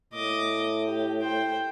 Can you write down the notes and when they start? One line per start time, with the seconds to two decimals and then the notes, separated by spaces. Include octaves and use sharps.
0.13 A2 D#5 D6
0.86 G4
1.22 C5 G5